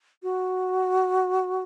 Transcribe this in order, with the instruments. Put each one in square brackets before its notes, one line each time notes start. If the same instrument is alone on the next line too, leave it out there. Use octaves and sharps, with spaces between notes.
[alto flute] F#4